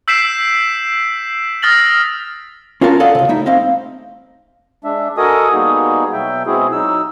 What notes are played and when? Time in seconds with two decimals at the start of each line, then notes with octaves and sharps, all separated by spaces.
0.08 E6 G6 B6 C7 D7 E7
1.62 D#6 F6 A6 A#6 F#7
2.81 C#4 F4 F#4 A#4 D#5 A5
3.00 A4 D5 D#5 F5 F#5
3.15 C#2 C#3
3.29 A3 D#4 E4
3.46 A3 C4 D#5 F5
4.84 G#3 D4 E5
5.17 F#4 A4 A#4 D#5 G#5 D#6
5.53 G3 A#3 B3 D#4 F#4 G#4
6.13 B2 F#3 E5 G5
6.46 B2 G#3 C4 E4 F#4 G#4
6.72 F#3 D#4 E6